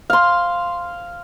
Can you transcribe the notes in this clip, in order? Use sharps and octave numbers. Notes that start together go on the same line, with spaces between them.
F5 C6